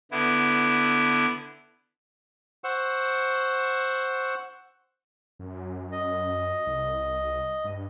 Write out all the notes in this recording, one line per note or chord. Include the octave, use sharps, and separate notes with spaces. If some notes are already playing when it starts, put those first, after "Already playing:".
D3 B3 E4
C5 F#5 C#6 E6
F#2
D#5
C2
G2